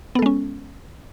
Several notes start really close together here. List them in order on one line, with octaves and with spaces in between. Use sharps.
B3 A4 G#3 C#4